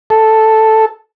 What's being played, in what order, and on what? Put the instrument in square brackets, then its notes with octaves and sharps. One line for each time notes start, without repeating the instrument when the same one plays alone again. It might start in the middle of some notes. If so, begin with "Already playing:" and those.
[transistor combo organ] A4